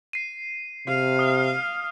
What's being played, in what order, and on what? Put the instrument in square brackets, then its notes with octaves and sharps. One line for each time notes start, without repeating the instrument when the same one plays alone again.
[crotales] C7 D#7
[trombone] C3 [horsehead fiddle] F5
[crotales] D#6 F6